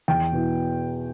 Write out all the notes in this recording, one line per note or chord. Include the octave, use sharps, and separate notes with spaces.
E2 G5
B2 B3 E4